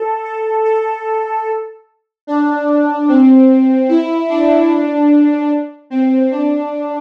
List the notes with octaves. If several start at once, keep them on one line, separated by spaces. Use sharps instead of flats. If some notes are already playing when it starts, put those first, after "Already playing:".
Already playing: A4
A4
A4
D4
C4
E4
D4
C4
D4